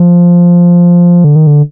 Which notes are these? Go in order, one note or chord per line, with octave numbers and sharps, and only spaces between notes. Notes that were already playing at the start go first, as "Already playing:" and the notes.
Already playing: F3
D3
D#3
D3